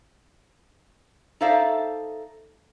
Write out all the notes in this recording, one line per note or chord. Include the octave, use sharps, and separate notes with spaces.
D#4 A4 C5 D5 E5 F5